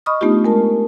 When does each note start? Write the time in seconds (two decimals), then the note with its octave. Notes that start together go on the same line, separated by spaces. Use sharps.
0.06 D#5 B5 C#6 D#6 F6
0.21 A3 B3 D4 D#4 F4 G4
0.44 G#3 A#4 A5